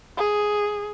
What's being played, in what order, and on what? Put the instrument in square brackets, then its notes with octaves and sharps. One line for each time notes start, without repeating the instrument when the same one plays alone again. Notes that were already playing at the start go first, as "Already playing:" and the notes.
[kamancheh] G#4